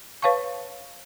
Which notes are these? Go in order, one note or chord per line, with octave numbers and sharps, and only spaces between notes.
B4 C#5 F5 A5 C#6